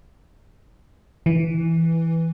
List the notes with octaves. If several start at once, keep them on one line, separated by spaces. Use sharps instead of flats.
E3